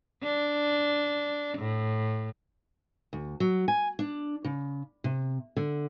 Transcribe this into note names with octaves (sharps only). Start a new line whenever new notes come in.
D4
A2
D2
F#3
G#5
D4
C#3
C3
D3